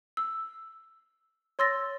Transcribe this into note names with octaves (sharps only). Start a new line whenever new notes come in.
E6
C#5 C6 E6 A6 A#6